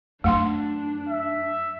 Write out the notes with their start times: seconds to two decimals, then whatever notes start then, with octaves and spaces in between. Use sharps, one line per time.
0.24 F#2 A3 D4 F#5 C6
1.09 E5